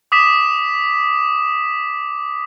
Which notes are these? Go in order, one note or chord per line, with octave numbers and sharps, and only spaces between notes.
D6 D#6 B6 E7